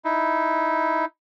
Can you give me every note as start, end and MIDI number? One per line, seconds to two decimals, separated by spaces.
0.05 1.05 63
0.05 1.05 64